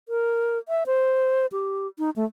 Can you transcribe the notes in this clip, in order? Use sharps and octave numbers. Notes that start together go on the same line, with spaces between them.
A#4
E5
C5
G4
D#4
A3